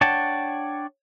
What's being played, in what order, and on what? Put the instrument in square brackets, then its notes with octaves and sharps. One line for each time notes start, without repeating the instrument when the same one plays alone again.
[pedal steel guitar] D4 C#5 F#5 G5 A5